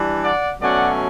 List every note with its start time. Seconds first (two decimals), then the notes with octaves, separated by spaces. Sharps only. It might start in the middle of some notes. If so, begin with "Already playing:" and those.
Already playing: E3 G3 D4
0.23 D5 F#5
0.61 B2 F#3 A3 C#4 D5 F#5